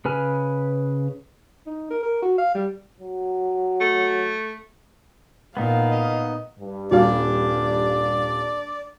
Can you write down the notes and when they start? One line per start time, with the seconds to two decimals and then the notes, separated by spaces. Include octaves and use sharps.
0.05 C#3 B4 G#5 F6
1.67 D#4
1.91 A#4
2.03 A#4
2.22 F#4
2.38 F5
2.55 G3
3.00 F#3
3.81 A3
5.57 A#2 B3 D#4 F5
5.91 D#5
6.60 G2
6.91 D#1 G3 D4 D5 F5